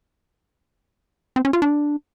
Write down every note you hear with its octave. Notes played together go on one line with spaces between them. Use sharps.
C4
C#4
F4
D4